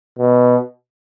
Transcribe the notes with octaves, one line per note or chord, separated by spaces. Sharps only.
B2